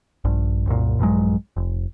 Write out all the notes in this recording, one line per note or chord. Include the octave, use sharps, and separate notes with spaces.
A#1 G2
C2 F#2 A#2
A#1 G2 F#3 G#3
F1